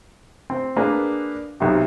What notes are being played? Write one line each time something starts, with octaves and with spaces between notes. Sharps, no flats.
C4
A#3 D4 G#4 B4
B1 C3